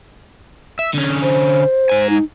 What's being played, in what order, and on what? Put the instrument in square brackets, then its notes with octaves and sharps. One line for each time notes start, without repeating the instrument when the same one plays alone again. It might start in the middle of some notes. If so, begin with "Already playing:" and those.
[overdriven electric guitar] E5
D3 C#4
[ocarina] C5
[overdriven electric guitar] G#2 G#5
[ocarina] D#4